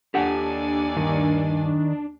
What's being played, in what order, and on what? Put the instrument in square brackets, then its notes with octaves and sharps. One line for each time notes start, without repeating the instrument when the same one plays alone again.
[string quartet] D#2 D5 G#5 [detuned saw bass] D4 [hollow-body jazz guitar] G4 A4 F#5
[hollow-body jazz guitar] G2 [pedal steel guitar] D#3